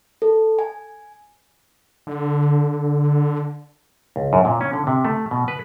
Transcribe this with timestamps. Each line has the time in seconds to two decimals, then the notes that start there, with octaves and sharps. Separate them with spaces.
0.22 A4
0.59 G#5
2.07 D3
4.16 C#2
4.33 F#2
4.45 A#2
4.61 C#4
4.73 D3
4.87 C3
5.05 A3
5.31 B2
5.48 B4